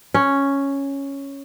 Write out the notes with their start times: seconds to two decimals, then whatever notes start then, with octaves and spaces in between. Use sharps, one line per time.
0.14 C#4